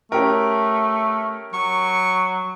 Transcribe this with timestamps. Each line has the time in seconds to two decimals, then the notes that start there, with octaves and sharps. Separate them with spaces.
0.12 A3 C#4 G4 A#4
1.54 F#3 C#6